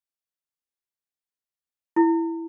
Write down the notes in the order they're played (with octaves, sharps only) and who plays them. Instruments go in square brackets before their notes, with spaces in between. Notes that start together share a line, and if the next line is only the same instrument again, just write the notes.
[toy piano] E4